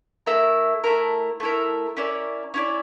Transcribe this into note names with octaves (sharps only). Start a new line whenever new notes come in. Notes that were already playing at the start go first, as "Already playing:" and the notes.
A3 E4 A#4
A3 E4 A#4
A3 E4 A#4
C#4 E4 A#4 D5
C#4 E4 A#4 D5